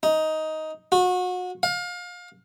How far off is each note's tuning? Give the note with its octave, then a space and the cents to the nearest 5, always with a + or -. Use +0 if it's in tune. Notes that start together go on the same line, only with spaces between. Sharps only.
D#4 +10
F#4 -30
F5 +30